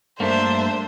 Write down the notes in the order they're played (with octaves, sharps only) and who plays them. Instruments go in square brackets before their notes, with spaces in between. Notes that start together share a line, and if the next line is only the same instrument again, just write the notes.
[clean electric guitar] G2 A3 A#3 [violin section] D4 E5 [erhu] C5